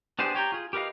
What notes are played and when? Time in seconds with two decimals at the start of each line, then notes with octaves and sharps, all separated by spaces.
0.19 B3 D4 G4 G#4 C5
0.35 G4 C#5 G5 A#5
0.52 F4 G#4
0.73 G4 A#4 B4 D#5 F5